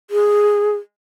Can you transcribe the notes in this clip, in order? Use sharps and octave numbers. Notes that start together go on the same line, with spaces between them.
G#4